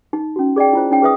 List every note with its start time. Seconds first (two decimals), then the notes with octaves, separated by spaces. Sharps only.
0.13 D#4
0.36 C#4 F#4
0.56 G#4 D5 D#5 G5
0.73 E4 F4 C5
0.91 C#4 D#4 C#5 G5
1.02 G#4 B4 E5 D#6